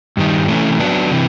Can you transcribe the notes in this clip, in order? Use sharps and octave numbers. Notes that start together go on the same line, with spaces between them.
G2 D#3 G3
C3 E3 A3 C#4
F#3 B3 D4
C3 E3